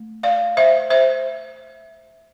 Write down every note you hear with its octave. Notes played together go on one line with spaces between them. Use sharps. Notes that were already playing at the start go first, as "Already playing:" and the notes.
Already playing: A3
D5 F5
C5 E5
C5 E5